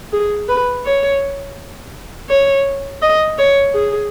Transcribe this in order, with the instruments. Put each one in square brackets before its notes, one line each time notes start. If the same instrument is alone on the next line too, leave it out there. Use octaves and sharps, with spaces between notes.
[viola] G#4
B4
C#5
C#5
D#5
C#5
G#4